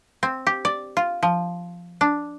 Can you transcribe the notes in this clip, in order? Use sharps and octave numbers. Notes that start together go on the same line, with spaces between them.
C4
G4
D5
F4
F3
D4